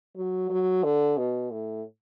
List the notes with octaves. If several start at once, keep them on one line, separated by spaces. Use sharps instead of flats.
F#3
F#3
D3
B2
A2